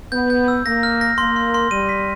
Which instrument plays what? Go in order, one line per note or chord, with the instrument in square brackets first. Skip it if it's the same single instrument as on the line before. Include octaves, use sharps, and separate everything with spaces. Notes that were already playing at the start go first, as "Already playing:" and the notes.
[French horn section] B3 [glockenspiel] G6
[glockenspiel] G6
E6
[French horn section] A#3 [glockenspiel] A#6
[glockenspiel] F6
A#6
[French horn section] A#3 [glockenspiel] C6
[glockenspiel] C6
C6
[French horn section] G3 [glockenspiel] D#7
[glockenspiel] B6